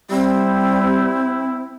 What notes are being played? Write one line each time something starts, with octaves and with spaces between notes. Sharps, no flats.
G3 C4 E4